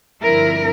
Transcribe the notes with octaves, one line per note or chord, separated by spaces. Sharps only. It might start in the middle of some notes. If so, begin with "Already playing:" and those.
G2 D3 F3 C4 E4 A#4